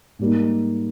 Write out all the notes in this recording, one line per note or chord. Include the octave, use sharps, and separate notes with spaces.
G#2 G3 A#3 D#4